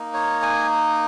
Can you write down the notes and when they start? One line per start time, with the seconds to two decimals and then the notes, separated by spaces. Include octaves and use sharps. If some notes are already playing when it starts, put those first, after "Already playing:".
Already playing: A#3 D#4
0.14 C#5
0.42 G#5